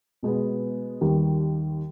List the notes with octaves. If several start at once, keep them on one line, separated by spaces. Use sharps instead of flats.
B2 G#3 B3
D#2 D#3 G3